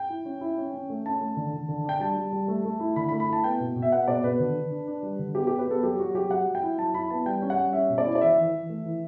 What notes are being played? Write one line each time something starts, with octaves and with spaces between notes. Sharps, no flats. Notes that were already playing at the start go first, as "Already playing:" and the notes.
Already playing: G5
E4
C#4
E4
C#4
C#4
A3
C#4 A5
A3
D3
D3
D3
D4 G5
G3 A5
G3
G3
A3
A3
E4
D3 B5
B5
A3
B5
E4 A5
B3 G5
B2
B2
E5
B3 F#5
B2 D5
B2 B4
D3
D3
D4
D4
G3
D3
B3 G4
B3 G4
B4
B3 A4
F#3 G4
F#3 F#4
F#4
F#3 G4
F#3 F#5
F#3
G5
E4
F#3 A5
E4 B5
B3 A5
G3 G5
C#4
F#5
G3
C#4 E5
B2
D5
E4
D5
E3 E5
E3
E3
A3
E3